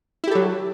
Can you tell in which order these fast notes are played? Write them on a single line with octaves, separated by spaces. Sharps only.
E4 G4 A4 F#3